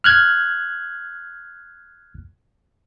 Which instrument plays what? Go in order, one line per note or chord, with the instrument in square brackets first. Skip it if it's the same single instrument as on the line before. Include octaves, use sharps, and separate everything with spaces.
[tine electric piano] F6 F#6 G#6